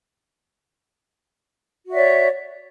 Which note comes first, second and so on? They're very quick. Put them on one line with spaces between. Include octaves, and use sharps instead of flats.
F#4 E5 D5 C#5